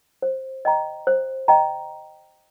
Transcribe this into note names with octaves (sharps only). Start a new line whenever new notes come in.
C5
D#5 G5 A#5
C5
D#5 G5 A#5